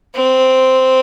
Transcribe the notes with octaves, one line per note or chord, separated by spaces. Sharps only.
C4